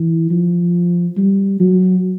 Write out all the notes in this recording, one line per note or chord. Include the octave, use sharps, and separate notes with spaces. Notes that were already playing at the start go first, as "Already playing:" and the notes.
Already playing: E3
F3
G3
F#3